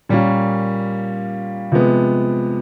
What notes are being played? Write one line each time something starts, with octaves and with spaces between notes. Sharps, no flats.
A#2 G3 A#3 C#4 F4
C3 F3 G#3 B3